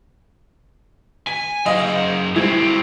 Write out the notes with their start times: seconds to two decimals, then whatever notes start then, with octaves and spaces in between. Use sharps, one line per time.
1.27 G#5 B6
1.66 F#2 G#4 D#5 F5
2.36 D3 G3 C4 E4 G#6